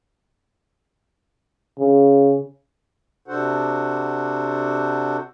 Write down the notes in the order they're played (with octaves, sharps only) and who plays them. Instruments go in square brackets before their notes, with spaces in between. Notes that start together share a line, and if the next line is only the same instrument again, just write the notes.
[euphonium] C#3
[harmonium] C3 D4 F#4 A4 C5 F#5